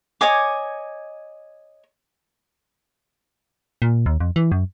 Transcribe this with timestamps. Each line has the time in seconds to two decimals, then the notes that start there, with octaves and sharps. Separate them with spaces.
0.21 C#5 D#5 G#5 D6
3.82 A#2
4.06 D#2
4.20 F2
4.36 E3
4.52 F#2